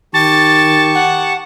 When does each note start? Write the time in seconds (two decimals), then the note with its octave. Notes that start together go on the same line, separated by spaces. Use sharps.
0.14 D#3 G4 A5 C#6 A6
0.95 F#5